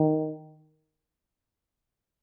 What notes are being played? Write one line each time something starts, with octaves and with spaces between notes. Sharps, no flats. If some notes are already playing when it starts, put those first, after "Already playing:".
Already playing: D#3